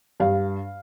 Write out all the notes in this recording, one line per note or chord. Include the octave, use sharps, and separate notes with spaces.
G2 F5